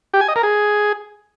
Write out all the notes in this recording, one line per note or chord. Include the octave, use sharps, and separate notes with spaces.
G4
G#5
D#5
A#4
G#4